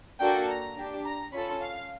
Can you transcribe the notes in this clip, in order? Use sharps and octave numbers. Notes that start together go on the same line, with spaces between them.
A#3 D4 F#4 A4 G5
A#5
D4 G4
A#5
C#4 F4 A4 B5
F5